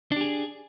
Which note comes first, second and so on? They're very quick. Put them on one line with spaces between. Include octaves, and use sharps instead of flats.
D4 G4 G#4